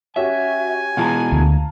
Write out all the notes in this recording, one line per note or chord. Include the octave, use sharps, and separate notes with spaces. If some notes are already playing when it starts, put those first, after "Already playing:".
C#4 F#4 G4 E5 G#5
B2 E3 G#3 F4 A5 A#5
D2